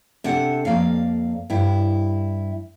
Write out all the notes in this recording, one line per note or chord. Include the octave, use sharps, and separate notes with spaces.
C3 D4 A4 F#5
F2 A#3 D5 F5
G2 E4 G5